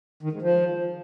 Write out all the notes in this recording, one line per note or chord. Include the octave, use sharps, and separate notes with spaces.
D#3
G#2
F3